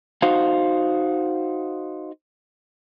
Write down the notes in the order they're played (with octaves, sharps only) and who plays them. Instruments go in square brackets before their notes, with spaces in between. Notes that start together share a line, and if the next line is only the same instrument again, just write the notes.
[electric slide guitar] D#4 F#4 C5 F5